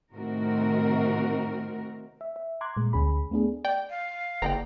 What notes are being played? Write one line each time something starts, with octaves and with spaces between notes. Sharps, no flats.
A2 C3 D#3 C4 F#4 A#4
E5
E5
A#5 C6 D6 F#6 G#6
A#2 G#3
D2 C#4 G#4 B5
A3 B3 D4 G#4
D5 G5
F5
F#1 C4 D5 G5 A#5